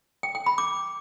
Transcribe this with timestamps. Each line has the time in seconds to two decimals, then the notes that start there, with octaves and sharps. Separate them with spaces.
0.23 G5
0.35 G5
0.46 B5
0.58 D6